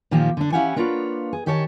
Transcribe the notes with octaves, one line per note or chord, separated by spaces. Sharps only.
A#2 D#3 F3 A#3 F4 G4
D3 D4
C#4 E4 G4 F5 F#5 G#5
A#3 D4 F4 B4 C#5
G#4
D#3 G4 G#4 C#5 F5 A5